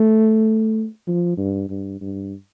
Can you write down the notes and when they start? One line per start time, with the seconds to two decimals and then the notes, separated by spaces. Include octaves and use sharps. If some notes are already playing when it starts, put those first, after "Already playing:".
Already playing: A3
1.07 F3
1.38 G2
1.69 G2
2.01 G2